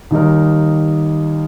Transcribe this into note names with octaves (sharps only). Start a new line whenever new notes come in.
D#2 D#3 G3 D#4 A#4